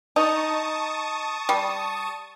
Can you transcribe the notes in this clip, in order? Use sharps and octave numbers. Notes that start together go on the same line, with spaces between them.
D#4 A5 C#6 D#6
G3